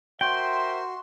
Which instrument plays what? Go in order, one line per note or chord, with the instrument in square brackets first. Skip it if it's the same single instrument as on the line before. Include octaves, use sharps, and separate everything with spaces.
[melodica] F#4 [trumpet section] A#4 C5 E5 [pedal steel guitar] G5 [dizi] C6